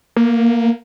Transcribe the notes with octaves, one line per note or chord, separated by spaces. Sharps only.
A#3